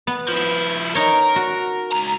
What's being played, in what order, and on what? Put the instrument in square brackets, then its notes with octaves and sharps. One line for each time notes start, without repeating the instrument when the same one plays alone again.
[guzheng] B3
[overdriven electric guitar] F3 E4
[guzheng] D#4 C#5 [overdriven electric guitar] A#4
[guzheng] F#4
[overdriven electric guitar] C#2 A#5